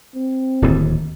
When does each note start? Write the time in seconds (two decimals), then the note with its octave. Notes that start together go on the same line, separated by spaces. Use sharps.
0.16 C4
0.62 D1 D#2